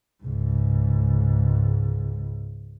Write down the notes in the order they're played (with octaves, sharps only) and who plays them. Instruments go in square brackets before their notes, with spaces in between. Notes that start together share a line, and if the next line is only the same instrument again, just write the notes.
[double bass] C#2 G#2